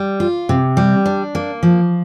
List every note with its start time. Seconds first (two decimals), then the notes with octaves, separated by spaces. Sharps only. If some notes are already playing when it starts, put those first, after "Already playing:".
Already playing: G3
0.20 F4
0.49 C3
0.77 G3
1.05 D4
1.35 A#3
1.63 F3